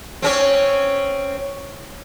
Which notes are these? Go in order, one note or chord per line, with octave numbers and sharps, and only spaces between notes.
C4 C#4 C#5